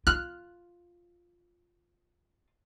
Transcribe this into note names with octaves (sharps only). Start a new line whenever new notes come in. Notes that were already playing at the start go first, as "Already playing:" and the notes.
F4 F6 F#6